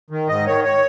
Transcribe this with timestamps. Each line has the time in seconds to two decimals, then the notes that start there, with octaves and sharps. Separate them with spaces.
0.10 D#3
0.29 G#2 D#5
0.46 D#3 C#5
0.64 C#5